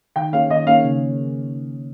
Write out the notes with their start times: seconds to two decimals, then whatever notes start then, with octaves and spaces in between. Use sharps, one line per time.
0.16 D#3 G5
0.33 A#3 C#4 G#4 C#5 F5
0.50 D#3 D#5
0.67 A#3 C#4 G#4 C#5 F5
0.84 C#3